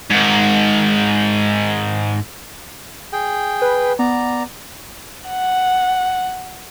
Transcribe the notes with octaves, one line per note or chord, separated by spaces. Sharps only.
G#2 D#3
G#4 G5
B4
B3 D5 A#5
F#5